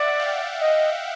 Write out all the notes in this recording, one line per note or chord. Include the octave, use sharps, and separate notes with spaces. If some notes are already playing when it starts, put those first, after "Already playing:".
Already playing: D5 E5 F#5
F5 G5
D#5